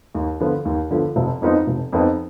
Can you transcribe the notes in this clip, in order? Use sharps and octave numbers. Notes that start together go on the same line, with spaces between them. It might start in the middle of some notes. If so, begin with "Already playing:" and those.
D#2
D3 F3 B3 F4
D#2
D3 F3 B3 F4
F1
F2 F3 B3 D#4
F1
F2 F3 B3 D#4